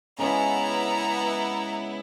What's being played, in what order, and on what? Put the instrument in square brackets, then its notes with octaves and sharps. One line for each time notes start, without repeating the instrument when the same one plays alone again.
[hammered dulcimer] C#3 G#3 C#4 [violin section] B3 E4 [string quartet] A#5